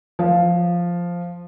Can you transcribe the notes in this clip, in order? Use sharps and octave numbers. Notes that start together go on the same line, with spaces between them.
F3